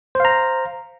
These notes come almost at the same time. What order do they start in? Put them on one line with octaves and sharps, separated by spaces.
C5 F5 A#5